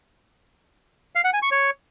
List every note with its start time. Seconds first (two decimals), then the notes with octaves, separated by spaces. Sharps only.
1.15 F5
1.24 F#5
1.33 G#5
1.42 C#6
1.51 C#5